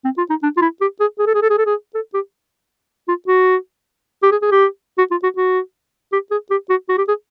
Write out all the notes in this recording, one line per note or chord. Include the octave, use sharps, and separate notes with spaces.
C4
F4
D#4
D4
F4
E4
G4
G#4
G#4
A4
G#4
A4
G#4
A4
G#4
A4
G4
F4
F#4
G4
G#4
G#4
G4
F#4
F4
F#4
F#4
G4
G#4
G4
F#4
F#4
G4
G#4